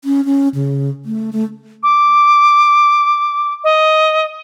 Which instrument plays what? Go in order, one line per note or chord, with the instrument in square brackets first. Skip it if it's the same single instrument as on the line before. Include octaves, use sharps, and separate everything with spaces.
[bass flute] C#4
C#4
C#3
A3
A3
[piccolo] D6
D#5